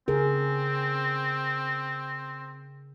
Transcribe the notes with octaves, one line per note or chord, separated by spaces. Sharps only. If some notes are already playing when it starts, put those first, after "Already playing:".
C#3 C4 G#4 A#4